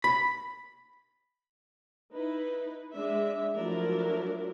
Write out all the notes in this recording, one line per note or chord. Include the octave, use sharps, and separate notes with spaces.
B5
D#4 E4 B4
G#3 D4 E5
F3 F#3 A3 D4 E4 A#4